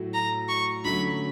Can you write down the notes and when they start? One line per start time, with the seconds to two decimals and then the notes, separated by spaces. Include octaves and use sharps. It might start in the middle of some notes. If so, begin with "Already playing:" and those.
Already playing: A2 F#3 A3
0.14 A#5
0.48 C#6
0.84 D3 F#3 A3 C#4 B5